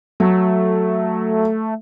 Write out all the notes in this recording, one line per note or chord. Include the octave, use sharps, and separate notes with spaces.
F#3 A3